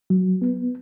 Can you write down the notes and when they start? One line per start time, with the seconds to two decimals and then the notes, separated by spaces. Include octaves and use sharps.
0.10 F#3
0.42 B3